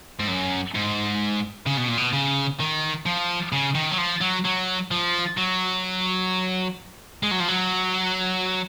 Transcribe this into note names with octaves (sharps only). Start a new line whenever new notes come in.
G#2
F#2
G#2
C#3
B2
A#2
B2
C#3
D#3
F3
C#3
D#3
F#3
F3
F#3
F#3
F3
F#3
G#3
F#3
F3
F#3